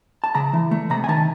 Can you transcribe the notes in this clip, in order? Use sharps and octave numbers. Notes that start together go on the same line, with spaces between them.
A5
C#3 A#5
E3
A3
C3 A#5
G#5
D#3 A5